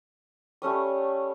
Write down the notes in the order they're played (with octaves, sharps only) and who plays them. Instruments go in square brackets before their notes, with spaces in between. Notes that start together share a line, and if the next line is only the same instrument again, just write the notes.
[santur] G3 A3 C#4 D#6